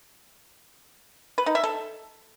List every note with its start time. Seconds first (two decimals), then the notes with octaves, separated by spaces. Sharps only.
1.38 B4
1.46 D#4
1.55 E5
1.64 A4